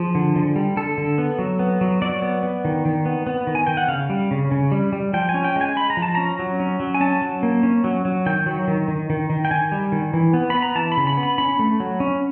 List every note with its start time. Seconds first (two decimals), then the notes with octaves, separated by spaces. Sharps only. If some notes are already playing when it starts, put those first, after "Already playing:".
Already playing: F3 G#4
0.15 D3
0.36 D3
0.56 G3
0.77 D3 A4
0.98 D3
1.18 B3
1.39 F#3
1.59 B3
1.81 F#3
2.02 F#3 D5
2.22 B3
2.43 B3
2.65 D#3
2.85 D#3
3.06 B3
3.27 B3
3.47 D#3
3.55 G#5
3.67 D#3 G5
3.77 F#5
3.88 C#3 F5
4.10 G3
4.31 C#3
4.51 C#3
4.72 G3
4.93 G3
5.14 F3 G5
5.29 G#5
5.34 C#4
5.44 G5
5.56 G#3
5.61 G#5
5.76 G#3 B5
5.90 A#5
5.97 F3
6.02 A5
6.15 C#4 A#5
6.39 F#3
6.60 C#4
6.80 F#3
6.95 G#5
7.01 C#4 A5
7.22 F#3
7.43 A#3
7.63 C#4
7.84 F#3
8.05 F#3
8.26 D#3 G5
8.46 F#3
8.68 D#3
8.88 D#3
9.10 D#3
9.30 D#3
9.45 G5
9.51 D#3 G#5
9.72 G3
9.92 D#3
10.13 E3
10.34 B3
10.50 B3 B5
10.62 A#5
10.75 E3 A5
10.92 B5
10.97 C#3
11.07 B5
11.17 B3
11.23 B5
11.38 C#4 B5
11.59 A3
11.80 F#3
12.00 C#4